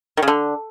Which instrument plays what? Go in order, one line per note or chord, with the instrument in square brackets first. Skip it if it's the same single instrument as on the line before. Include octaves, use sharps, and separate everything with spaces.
[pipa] D#3
C#3
D3